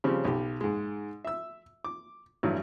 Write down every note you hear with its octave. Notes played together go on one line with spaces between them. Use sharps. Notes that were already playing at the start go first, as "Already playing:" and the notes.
C#3 F3 G3 C4 C#4
B1 G4
G#2 G#3
E5 E6
D6
A1 G2 E3 F#3